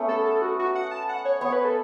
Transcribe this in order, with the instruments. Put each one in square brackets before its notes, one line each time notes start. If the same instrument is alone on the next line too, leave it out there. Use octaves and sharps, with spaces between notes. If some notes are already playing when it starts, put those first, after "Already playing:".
Already playing: [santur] A3 B3 C#4
[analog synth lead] A4
A4
F#4
F#4
F#5
A5
F#5
C#5
[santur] B3 [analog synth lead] C#5
[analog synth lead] B4
A4